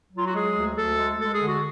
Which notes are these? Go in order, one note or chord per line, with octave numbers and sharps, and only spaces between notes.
F#3 F4
F#4
G#3 G#4
D2
D2 A4
G#3
G#3 A4
G#4
D3
F#4